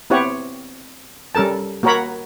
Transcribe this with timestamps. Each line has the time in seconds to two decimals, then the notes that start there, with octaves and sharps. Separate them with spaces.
0.10 B3 C4 E4 G4 C#5 F#5
1.35 G3 C#4 A4 A#4 A5
1.83 A#3 F#4 A#4 C#5 A#5 B5